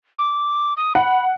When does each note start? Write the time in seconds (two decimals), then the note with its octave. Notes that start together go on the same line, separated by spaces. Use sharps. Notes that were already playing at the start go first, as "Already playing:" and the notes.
0.19 D6
0.77 D#6
0.95 F#5 B5